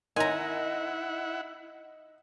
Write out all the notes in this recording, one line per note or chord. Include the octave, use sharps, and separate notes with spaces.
D#4 E4 A#4 C#5 F#5 G#5 A#5 C6